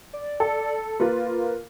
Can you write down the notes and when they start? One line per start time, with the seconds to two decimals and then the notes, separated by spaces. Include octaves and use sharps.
0.13 D5
0.40 A4
1.00 A#3 F4 B4